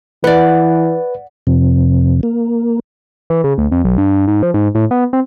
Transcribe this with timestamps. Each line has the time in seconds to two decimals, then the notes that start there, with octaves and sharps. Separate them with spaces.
0.24 E3 B4 D5 F#5
1.47 F2 C3
2.23 A#3
3.30 E3
3.44 C#3
3.58 D2
3.72 F2
3.84 B1
3.98 G2
4.28 G#2
4.43 F3
4.54 G#2
4.75 A2
4.91 B3
5.13 C4